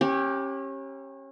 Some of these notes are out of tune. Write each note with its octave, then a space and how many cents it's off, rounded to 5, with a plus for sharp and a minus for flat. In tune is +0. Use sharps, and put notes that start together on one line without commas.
C#4 -30 G4 +0 A#4 +40